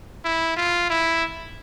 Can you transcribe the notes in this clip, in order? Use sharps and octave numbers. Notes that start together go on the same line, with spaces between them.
E4
F4
E4